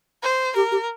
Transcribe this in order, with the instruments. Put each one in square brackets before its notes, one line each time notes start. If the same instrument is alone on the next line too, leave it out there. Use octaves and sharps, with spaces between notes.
[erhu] C5
[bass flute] G4 [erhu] A#4
[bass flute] G4